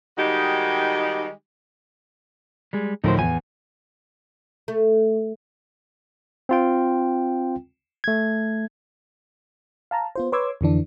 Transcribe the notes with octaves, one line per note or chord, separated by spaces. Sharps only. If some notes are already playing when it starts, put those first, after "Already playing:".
D#3 G3 G#3 D#4 F#4 G4
G3 G#3 G#4
D2 A2 F3 D#4 A#4 C5
E2 G#5
A3
C4 F4 G5
A3 G#6
F5 A5 A#5
B3 F4 C5
B4 C#5 C6 D6 E6 G#6
F2 D3 E3 D4